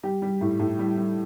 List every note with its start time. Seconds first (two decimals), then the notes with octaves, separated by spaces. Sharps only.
0.03 G3 G4
0.22 G3
0.41 A2
0.59 A2
0.79 G3
0.97 G3